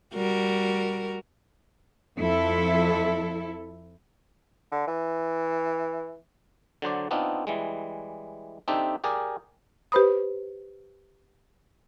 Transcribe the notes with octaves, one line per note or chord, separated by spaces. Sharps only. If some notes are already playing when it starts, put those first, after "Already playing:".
G3 F#4 A#4
F2 E4 A4
D3
E3
D3 F#3 C5 D5
B3 C4 D4 D#4 F4
E3 G3 G#3
C4 D4 D#4 G4 A4 E5
G4 G#4 A#4 D5 G#5
G4 B4 C5 B5 D#6